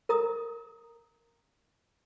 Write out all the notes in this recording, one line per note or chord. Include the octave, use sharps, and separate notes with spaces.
A#4 A#5 D#6